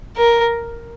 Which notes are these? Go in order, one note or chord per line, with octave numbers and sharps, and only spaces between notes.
A#4